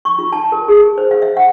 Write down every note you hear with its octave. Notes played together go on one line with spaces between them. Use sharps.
C#6
F4
A5
A#4
G#4
C5
F5
E5
F#5